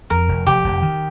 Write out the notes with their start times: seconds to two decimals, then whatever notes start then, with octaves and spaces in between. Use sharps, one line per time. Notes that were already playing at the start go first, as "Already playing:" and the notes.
0.10 F2 A#4
0.29 F1
0.47 F1 G4
0.64 F1
0.82 D#3